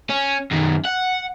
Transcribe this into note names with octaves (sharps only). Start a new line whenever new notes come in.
C#4
F#2 D#3
F#5